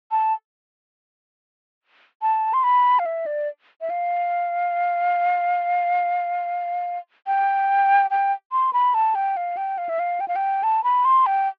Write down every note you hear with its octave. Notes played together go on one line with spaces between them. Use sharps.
A5
A5
C6
B5
F5
E5
D5
E5
F5
G5
G5
C6
B5
A5
G5
F5
G5
F5
E5
F5
G5
F5
G5
A5
B5
C6
G5